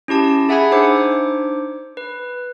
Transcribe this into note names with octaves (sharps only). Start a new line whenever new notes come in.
C#4 E4 G4 A5
G#4 E5 F#5 G#5 B5 G#6
D4 D#4 C5 D6
B4